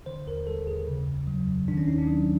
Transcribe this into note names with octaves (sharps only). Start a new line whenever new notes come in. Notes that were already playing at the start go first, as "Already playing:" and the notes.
D3 C5
D#2 A#4
G3 A4
D#2 G#4
C#3
F2
F#3
F2
D#3 D4
C#4
D#2 D#4
D4
F#3